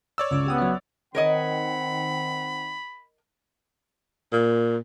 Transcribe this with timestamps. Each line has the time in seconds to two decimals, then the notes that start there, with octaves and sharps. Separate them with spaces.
0.18 C#5 D5 E6
0.31 C#2 C#3 D6
0.46 B3 G4 G5 D#6
0.58 F#3 E5
1.15 D#3 C4 A#4 C#5 D#5 F#5 B5
4.33 A#2